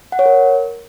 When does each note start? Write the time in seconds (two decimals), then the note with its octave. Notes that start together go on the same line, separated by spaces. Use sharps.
0.12 F#5
0.19 C#5
0.26 A#4